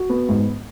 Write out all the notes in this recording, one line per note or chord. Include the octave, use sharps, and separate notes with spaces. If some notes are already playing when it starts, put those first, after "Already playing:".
Already playing: F#4
B3
G#2